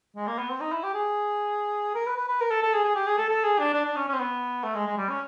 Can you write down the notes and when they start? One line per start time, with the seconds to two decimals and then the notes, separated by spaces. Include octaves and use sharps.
0.16 G#3
0.27 A#3
0.39 B3
0.50 C4
0.61 D#4
0.72 E4
0.84 G4
0.94 G#4
1.95 A#4
2.06 B4
2.17 B4
2.28 B4
2.41 A#4
2.51 A4
2.63 A4
2.74 G#4
2.84 G#4
2.95 G4
3.07 G#4
3.18 A4
3.30 A4
3.44 G#4
3.59 D4
3.74 D4
3.86 D4
3.96 C#4
4.09 C#4
4.14 C4
4.20 B3
4.64 A3
4.75 G#3
4.87 G#3
4.97 G3
5.09 C#4